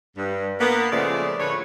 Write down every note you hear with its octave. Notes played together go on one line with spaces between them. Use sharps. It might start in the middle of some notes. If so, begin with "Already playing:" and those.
G2
A#3 B3
A#2 C#3 F3 G#3 A3 D5
A2 D3 B4 C#5